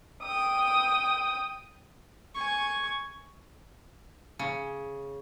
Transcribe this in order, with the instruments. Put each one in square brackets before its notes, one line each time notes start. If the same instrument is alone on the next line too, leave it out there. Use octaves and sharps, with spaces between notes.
[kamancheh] G5 D#6
[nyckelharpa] G#5 C#6
[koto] C#3